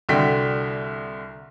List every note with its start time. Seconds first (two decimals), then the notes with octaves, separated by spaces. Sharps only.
0.09 C2 D3 F#4 G5 B6